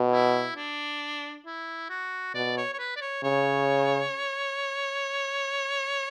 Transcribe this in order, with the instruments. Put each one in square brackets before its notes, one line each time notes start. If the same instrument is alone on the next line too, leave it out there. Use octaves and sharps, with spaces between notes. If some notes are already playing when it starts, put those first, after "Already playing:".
Already playing: [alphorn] B2
[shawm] E4
D4
E4
F#4
[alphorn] B2 [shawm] D5
[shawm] C#5
C#5
B4
D5
C#5
[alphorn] C#3 [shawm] C#5